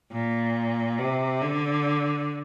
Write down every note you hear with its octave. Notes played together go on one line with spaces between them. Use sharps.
A#2
C3
D3